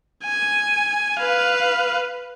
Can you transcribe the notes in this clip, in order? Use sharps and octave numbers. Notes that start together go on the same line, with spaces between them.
G#5
B4 F5